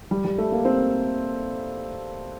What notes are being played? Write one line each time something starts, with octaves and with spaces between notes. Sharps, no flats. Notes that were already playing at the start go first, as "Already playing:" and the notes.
G3
G3
A3
A#3
C4